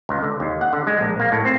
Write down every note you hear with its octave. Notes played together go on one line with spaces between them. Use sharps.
C#2
D3
D#2
F#5
D3
G#3
A#1
A#3
A2
C4